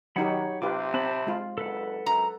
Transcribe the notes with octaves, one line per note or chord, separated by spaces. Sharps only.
D#3 F#3 D#4 G4 C#5 F#5 B5
C3 F4 G4 B4 D6
C4 A5 B5
G#3 F4
F#1 A4 B4 F#5
F#2 A#5